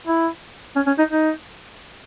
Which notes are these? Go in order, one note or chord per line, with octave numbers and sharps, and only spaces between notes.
E4
C#4
C#4
D#4
D#4